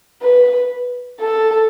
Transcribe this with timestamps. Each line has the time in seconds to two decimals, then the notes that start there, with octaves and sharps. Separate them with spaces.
0.22 B4
1.20 A4